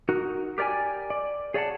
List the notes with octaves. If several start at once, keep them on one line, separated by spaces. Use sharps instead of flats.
D#4 F#4 A#4
G4 A#4 D5 G5 G#5
D5
G#4 C#5 D5 E5 F#5 A5